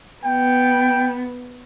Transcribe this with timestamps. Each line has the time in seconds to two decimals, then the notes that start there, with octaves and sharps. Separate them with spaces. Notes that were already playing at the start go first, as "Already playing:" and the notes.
0.24 B3 G5